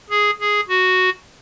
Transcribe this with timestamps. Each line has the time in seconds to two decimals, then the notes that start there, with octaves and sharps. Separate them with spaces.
0.10 G#4
0.40 G#4
0.69 F#4